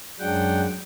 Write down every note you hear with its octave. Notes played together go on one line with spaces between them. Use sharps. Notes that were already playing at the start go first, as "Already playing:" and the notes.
F#2 F#3 G#3 D4 F#5 G5